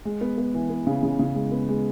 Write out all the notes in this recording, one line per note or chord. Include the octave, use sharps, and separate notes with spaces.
G#3
B3
B3
E3
B3
C#3
C#3
C#3
G#3
B3
G#3